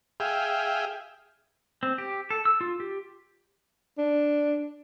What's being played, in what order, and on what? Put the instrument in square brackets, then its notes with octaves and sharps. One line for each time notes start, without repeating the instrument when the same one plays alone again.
[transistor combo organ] G#4 E5 F5 G5
[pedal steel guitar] C4
G4
A4
E6
F4
G4
[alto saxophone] D4